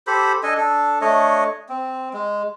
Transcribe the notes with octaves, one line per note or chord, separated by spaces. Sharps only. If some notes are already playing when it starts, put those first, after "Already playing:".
G4 A4 C5 B5
D4 A4 D#5 G#5
D4 A4
A3 D4 C#5 D#5
C4
G#3